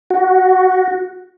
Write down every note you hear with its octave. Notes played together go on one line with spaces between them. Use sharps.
F#4